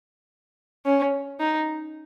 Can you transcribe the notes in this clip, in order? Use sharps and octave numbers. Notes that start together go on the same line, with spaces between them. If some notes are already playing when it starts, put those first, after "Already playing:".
C#4
D#4